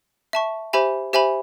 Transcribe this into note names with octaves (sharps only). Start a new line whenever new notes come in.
E5 A5 C#6
G4 C5 E5 G#5 B5
G4 C5 E5 G#5 B5